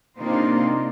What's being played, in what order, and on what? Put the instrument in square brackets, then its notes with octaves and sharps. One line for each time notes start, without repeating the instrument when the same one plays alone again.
[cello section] C3 A#3 D4 D#4 F4 C5